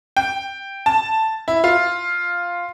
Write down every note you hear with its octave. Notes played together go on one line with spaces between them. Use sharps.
G5
A5
E4
F4